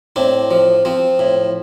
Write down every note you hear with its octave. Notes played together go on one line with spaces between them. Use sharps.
A2 C4 D4
F3
F3 C4
A2